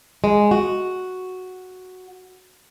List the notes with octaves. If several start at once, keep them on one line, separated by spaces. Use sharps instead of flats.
G#3
F#4